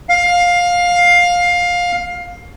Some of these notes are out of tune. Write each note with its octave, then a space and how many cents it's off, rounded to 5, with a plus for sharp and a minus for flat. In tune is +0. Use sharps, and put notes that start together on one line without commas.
F5 +15